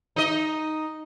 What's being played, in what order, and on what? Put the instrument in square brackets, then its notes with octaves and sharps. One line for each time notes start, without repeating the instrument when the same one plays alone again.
[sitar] D#4 D#5